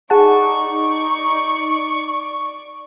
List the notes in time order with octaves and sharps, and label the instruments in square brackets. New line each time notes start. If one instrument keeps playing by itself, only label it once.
[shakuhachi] D#4 [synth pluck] G#4 F#5 A5 [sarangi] D5 [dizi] C#6